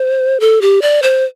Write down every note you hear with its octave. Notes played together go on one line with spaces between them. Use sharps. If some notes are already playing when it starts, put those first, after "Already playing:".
Already playing: C5
A4
G4
D5
C5